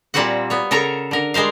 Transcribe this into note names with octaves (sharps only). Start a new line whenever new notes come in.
A#2 G3 A#3 C4 F#4 F#5
B3 C#5
C#3 A4 A#4 C#5 A#5
D3 A#4
G3 G#3 A#4 C5 F5